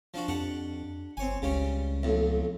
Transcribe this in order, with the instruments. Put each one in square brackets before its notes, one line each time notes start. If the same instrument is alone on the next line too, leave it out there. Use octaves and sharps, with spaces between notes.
[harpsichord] F3 D4 F#4
[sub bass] F2 [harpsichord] D4 G4 F#5
[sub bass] G1 [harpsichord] C4 C#5 G#5
[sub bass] C#2 [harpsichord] C#3 G3 C#4
[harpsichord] B1 F2 A2